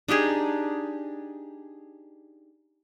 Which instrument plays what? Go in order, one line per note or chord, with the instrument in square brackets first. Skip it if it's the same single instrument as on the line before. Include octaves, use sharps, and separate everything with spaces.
[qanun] D4 D#4 G4 G#4